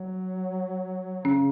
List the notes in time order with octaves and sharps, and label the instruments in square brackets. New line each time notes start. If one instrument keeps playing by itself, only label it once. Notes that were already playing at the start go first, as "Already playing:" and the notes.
Already playing: [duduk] F#3
[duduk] C#3 [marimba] C#4